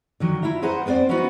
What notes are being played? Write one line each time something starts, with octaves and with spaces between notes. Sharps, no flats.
D3 D#3 F#3
E4 F4 E5 A#5
G#4 B4 C5 F#5 A#5
B3 C4 B4 C5 D5
B3 C#4 D#4 E4 F#4 C5